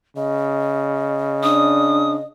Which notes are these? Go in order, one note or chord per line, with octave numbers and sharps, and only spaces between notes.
C#3 D#5
D4 D#6